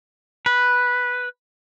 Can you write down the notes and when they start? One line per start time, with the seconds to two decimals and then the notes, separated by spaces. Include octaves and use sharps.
0.46 B4